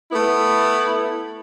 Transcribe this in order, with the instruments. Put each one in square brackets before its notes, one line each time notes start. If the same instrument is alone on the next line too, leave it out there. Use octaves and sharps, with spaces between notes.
[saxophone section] A3 B3 E4